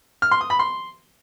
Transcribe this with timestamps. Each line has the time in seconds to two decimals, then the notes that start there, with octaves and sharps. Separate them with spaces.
0.22 F6
0.31 C6
0.41 D#6
0.50 B5
0.59 C6